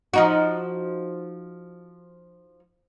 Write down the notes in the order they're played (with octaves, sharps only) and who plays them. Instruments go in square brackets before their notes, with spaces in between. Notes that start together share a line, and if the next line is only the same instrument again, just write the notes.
[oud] F3 D#4 F#4